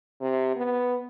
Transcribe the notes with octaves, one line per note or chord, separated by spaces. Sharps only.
C3
B3